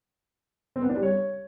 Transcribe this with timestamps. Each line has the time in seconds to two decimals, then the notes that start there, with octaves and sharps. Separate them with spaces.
0.76 C4
0.82 B3
0.89 D4
0.96 G3
1.03 C#5